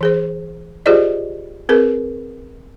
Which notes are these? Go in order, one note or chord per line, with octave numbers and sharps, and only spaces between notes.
E3 G#4 C5
F4 G4 G#4 C5 D5 D#5
C4 G#4 A#4 B4